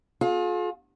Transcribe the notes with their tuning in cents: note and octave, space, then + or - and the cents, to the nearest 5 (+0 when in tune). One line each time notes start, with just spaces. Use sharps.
F4 +35 G#4 +45